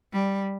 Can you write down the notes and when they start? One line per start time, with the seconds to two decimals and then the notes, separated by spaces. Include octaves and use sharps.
0.13 G3